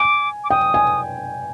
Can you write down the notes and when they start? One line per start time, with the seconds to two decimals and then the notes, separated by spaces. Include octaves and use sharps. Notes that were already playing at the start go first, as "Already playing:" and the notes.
Already playing: G#5 D6
0.44 D6
0.50 G5 D#6
0.74 G#5